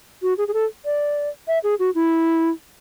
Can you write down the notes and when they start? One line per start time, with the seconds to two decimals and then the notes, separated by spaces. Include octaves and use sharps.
0.22 F#4
0.38 G#4
0.48 G#4
0.53 A4
0.85 D5
1.47 E5
1.64 G#4
1.79 F#4
1.95 E4